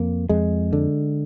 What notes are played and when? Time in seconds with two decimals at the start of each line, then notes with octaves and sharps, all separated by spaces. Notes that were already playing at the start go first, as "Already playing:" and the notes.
Already playing: F2 A#3
0.29 F2 G#3
0.73 D3